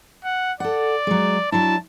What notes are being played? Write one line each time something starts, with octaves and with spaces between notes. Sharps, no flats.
F#5
A4 D5 F#5
F#3 G#3
F#3 D4 E4 A5